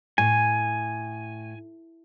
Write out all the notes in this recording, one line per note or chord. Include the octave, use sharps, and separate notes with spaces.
A2 G#5